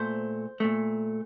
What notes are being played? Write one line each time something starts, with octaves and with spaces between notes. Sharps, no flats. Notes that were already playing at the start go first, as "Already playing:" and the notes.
Already playing: A#2 A3 C5
A#2 A3